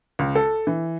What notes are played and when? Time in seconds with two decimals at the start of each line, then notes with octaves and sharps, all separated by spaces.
0.19 C#2
0.35 A4
0.67 E3